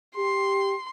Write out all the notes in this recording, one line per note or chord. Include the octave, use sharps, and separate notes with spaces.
G4 C6